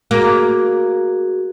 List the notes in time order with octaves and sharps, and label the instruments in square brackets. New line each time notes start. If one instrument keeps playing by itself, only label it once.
[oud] A#3 [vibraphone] F#4 G#4